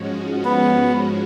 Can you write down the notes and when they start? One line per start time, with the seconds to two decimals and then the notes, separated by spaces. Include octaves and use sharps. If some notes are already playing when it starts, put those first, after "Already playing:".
Already playing: G#2 F3 G#3 C#4 F#4
0.45 B3